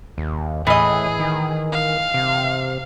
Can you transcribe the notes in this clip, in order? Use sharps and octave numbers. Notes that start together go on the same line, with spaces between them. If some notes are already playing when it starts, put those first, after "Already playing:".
D#2
A2 E3 G#4 D#5
D#3
F5
C3